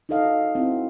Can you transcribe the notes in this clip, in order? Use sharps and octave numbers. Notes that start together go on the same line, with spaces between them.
D#4 F#4 A4 D#5 F5
C4 E4 F#4